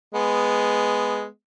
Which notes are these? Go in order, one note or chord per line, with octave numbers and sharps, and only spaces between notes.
G#3 B3